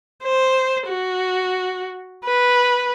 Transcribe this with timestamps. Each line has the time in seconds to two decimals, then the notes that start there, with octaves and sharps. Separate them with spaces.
0.23 C5
0.88 F#4
2.25 B4